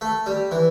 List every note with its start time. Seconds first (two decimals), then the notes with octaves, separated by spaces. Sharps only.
0.01 A3
0.26 G3
0.51 E3